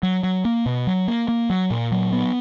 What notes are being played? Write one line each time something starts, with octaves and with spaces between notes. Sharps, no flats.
F#3
F#3
A#3
B2
F#3
A#3
A#3
F#3
A#2
F#3
B3